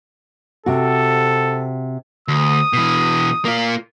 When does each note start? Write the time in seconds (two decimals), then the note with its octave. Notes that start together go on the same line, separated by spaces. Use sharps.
0.66 C3 F#4 A4
2.28 D2 D#6
2.73 B2 E3
3.45 A#3 F4